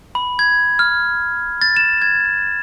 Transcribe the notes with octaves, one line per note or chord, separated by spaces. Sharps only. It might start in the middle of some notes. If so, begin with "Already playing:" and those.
B5
G#6
F6
A6
E7
G#6